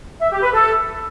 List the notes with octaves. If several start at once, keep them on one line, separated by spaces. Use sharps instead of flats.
E5
G4
B4
A4